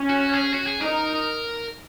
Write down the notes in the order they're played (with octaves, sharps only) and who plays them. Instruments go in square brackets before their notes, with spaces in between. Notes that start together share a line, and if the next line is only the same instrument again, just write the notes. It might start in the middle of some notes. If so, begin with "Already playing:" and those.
Already playing: [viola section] C#4
[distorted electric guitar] F#4
G#4
F#4
G#4
[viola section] D#4 [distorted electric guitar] A#4